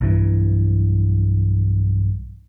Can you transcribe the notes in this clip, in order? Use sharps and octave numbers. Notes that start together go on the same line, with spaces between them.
B1 G2 E3